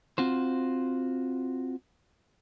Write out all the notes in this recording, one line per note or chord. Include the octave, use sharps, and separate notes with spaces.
C4 F4 F#4 C5